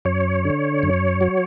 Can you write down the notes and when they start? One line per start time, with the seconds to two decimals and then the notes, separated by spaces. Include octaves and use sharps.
0.05 F#2 C#5
0.45 D3
0.83 F#2
1.21 F#3